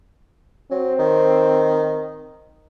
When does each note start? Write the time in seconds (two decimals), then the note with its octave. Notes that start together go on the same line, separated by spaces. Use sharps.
0.71 F#3 C4
0.99 D#3